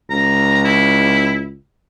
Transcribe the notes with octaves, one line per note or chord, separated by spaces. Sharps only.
C#2 A#5
E4